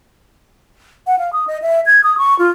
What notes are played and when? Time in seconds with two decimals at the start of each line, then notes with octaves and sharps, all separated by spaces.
1.07 F#5
1.19 F5
1.33 D#6
1.47 D#5
1.62 E5
1.86 G#6
2.04 D#6
2.18 C#6
2.39 F4